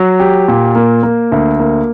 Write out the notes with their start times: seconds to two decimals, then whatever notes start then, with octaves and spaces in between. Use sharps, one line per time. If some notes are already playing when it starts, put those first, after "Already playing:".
Already playing: F#3
0.20 G4
0.48 A#2
0.75 A#3
1.03 A#3
1.32 D2
1.60 A#3